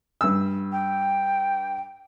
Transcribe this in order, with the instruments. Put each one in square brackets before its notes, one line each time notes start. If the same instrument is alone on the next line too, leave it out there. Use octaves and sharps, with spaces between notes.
[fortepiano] G2 E6
[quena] G5